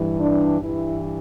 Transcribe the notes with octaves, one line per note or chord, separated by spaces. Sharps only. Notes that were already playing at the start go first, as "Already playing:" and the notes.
Already playing: G2 E3
D4
G2 E3 E4